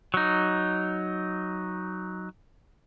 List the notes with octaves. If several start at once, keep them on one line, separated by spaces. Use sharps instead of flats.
F#3 D#4